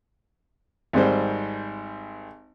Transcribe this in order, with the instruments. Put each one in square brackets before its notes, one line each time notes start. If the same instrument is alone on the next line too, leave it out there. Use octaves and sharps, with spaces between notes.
[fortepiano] G#1 G#2 G3 C5